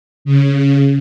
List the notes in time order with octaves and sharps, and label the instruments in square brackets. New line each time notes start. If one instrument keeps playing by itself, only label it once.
[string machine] C#3